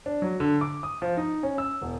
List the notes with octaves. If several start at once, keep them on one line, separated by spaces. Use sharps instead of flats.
D4
F#3
D3
D6
D#6
F3
D#4
C#4
E6
E1